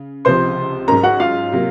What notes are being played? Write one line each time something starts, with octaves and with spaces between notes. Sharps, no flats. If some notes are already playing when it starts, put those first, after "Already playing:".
Already playing: C#3
C#2 C3 F3 C5 C6
G#2 F#3 C#4 A#4 A#5
F#4 F#5
F4 F5
C3 F#3 A#3